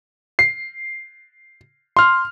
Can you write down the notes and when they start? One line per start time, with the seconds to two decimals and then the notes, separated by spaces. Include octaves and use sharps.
0.39 C7
1.97 C6 F6